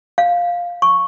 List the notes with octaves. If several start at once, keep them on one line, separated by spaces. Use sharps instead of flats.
F5
C#6